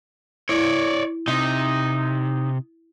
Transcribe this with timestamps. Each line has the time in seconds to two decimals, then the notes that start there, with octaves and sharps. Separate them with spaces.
0.49 E4 C#5 D5
1.28 C3 D#4